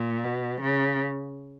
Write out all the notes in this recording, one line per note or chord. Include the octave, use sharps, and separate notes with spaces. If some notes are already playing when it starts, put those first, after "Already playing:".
Already playing: A#2
B2
C#3